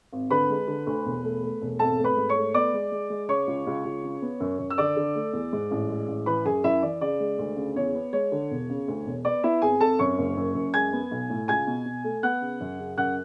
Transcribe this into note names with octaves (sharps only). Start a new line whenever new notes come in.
G#1
D3 B4 B5
G#3
D3
D2
E1
A3
A3
E1
G#1 A4 A5
A3
B4 B5
G#2
C#5 C#6
A3
B3 D5 D6
G#3
G#3
G#3
C#3 C#5 C#6
C#2
C#2
C#2
C#3
B3
F#2
F#2
E6
D3 D5 D6
D3
A3
E2
G#2
A1
G#3
A1
E3 B4 B5
F#2 G#4 G#5
F#2 E4 E5
E3 D5
C#3 D5
G#3
D2
C#3
E2 C#5
B3
G#3 C#5
D3
E1
C#3
D2
E1
B3 D5
B3 E4 E5
G#1 G#4 G#5
G#1 A4 A5
F#2 C#5 C#6
F#1
F#2
F#2
G#3 G#5 G#6
B3
B1
A2
C#2 G#5 G#6
B2
B2
A3
B3 F#5 F#6
C#3
F#2
C#3
F#2 F#5 F#6